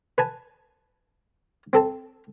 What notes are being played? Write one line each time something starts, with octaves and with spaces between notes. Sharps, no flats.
B4 G#5 A5
C4 A4 A5